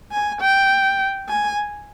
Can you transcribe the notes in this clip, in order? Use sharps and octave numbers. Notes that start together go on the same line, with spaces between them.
G#5
G5
G#5